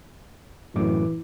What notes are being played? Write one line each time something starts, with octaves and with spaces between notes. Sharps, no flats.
F#2 A2 E3 D6